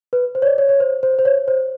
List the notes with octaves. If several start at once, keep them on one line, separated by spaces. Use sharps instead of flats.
B4
C5
C#5
D5
C#5
C#5
C5
C5
C5
C#5
C5